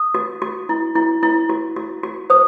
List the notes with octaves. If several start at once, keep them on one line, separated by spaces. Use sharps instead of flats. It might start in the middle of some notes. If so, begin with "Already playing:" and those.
Already playing: D#6
F#4
F#4
E4
E4
E4
F#4
F#4
F#4
C5 D#6